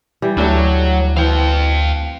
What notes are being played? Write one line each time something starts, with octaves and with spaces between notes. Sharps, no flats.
E3 G3 G4
D2 F#3 A3 D4 E4 G4
E3 C4 F5 G5